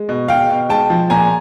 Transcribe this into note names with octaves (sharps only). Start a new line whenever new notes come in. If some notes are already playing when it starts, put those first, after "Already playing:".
Already playing: G#3
B2
B2 F5 G5
B2
G#3 G5 A5
F3
A#2 G#5 A#5